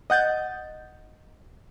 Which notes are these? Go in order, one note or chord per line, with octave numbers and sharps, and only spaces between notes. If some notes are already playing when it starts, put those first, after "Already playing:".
D#5 F#5 G6 A6